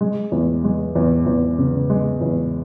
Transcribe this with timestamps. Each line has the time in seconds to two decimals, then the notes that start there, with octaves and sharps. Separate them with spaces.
0.01 G#3
0.32 E2
0.64 G#3
0.95 E2
1.26 E2
1.58 C#3
1.90 G#3
2.21 E2